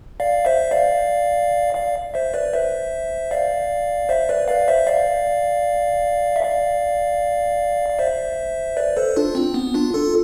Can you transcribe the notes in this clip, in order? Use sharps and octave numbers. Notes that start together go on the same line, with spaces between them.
D5 F5
C5 E5
D5 F5
D5 F5
C5 E5
B4 D5
C5 E5
D5 F5
C5 E5
B4 D5
D5 F5
C5 E5
D5 F5
E5
D5 F5
F5
C5 E5
B4 D5
A4 C5
D4 F4
C4
B3
D4 F4
F4 A4